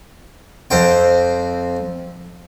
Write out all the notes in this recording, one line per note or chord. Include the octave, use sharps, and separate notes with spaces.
F2 C4 G5